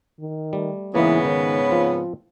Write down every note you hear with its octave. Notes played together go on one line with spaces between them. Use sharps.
D#3
G3 A3
G#2 C#3 E3 A#3 B3 D#5
D#3 C#5
F3 C4 F4